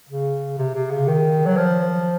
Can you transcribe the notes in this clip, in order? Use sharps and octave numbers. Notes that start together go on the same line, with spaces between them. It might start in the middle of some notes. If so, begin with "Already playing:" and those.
C#3
C3
C3
C#3
D#3
F#3
F3